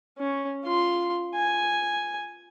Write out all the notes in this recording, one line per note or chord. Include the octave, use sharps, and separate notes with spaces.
C#4
F4 C6
G#5